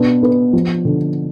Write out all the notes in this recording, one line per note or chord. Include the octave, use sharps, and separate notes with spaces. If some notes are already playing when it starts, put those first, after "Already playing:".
Already playing: B2 D4 B4
D4 B4
F3
D3